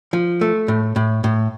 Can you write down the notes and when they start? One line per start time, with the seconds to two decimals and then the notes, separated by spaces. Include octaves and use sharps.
0.13 F3
0.41 A3
0.68 A2
0.96 A2
1.24 A2